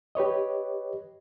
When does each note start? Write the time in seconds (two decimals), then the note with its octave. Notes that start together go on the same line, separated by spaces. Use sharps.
0.15 G4 B4 C#5 D#5